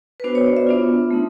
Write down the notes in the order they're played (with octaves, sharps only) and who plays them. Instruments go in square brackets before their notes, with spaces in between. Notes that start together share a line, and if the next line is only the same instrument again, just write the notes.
[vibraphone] B4
B3 D4 F#4 C5
C#5
D5
E5
B3 D4 F4
A3 C4 D#4